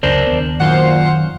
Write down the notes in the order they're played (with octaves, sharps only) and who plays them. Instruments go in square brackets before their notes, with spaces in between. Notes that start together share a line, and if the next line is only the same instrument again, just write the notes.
[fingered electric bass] C#2 F#2 C#3 [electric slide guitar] D4 A#4 C5
[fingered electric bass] D#2 B3
[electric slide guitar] F#2 [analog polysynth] A#2 C5 F5 [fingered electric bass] D#3 [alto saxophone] F#5